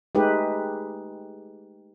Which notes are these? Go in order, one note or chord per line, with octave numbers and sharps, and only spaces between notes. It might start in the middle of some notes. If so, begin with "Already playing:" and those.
G#3 A3 D#4 G4 B4